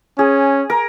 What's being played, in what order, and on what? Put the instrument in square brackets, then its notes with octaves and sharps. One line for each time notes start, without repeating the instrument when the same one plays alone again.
[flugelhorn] C#4 [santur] G#4
[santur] A#4